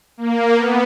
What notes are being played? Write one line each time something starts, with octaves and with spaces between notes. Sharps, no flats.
A#3
B3